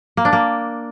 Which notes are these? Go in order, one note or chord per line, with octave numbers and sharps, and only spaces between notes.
A#3
D4
A#3